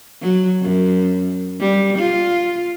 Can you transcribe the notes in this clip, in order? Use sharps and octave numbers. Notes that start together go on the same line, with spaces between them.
F#3
F#2
G3
F4